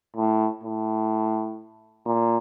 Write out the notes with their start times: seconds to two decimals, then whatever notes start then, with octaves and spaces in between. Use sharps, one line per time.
0.16 A2
0.64 A2
2.06 A#2